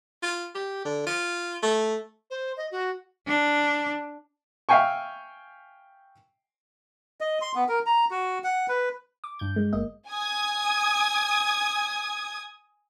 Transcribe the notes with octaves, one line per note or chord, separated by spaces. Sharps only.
F4
G4
D3
F4
A3
C5
D#5
F#4
D4
E5 F5 G5 G#5 C#6
D#5
C6
B3
A#4
A#5
F#4
F#5
B4
D6
G2 G6
G#3
G1 A#3 D#5
G#5 D#6 G#6